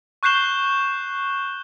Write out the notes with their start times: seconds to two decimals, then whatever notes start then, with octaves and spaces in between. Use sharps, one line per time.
0.23 C#6 F#6 G6 C7 E7 G7